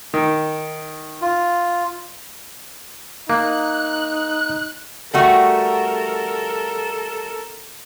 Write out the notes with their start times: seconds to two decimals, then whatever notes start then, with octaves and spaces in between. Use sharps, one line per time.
0.14 D#3
1.22 F4
3.30 A#3 D#4 F#6
5.14 G3 A3 F#4 A4 A#4